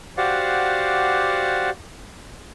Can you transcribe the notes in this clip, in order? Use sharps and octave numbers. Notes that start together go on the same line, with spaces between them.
F#4 G4 C5 D5 F5 F#5